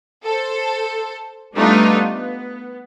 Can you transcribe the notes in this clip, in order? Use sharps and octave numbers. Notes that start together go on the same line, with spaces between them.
A4 C5
G3 A3 B3 D4 D#4 F4
B3